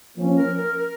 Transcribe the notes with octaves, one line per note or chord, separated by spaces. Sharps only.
F3 A#3 C#4
A#4
A#4
A#4